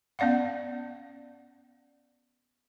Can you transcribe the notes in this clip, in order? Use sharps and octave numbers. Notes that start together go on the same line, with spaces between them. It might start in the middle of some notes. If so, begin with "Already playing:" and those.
B3 C#4 D5 F5 F#5